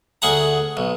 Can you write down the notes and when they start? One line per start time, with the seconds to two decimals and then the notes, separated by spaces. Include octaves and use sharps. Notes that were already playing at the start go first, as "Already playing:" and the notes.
0.22 D2 G#4 F#5 A#5
0.77 B1